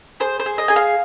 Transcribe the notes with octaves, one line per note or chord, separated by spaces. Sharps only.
G#4 C5
C5
G#4
D#5
G#4 G#5
F5